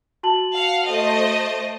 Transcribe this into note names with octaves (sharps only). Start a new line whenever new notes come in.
F#4 A5 F#7
F5 F#5
A3 C5 D#5